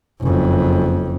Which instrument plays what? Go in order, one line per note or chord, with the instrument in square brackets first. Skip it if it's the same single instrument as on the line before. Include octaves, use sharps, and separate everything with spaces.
[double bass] F#1 F2